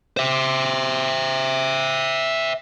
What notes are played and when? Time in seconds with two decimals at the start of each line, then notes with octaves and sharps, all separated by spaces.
0.17 C5 E5